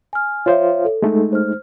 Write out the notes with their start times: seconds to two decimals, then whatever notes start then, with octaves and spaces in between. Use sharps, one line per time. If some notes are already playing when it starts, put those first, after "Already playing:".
0.13 G#5 F6
0.46 F4 C5 C#5 E5 F5
0.85 A4
1.02 G#3 A3 D#4
1.33 C5 F6